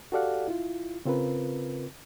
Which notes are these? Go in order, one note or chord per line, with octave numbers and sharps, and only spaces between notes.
F#4 G4 A4 D5 F5 F#5
E4 F4
C#3 C4 F4 A#4 B4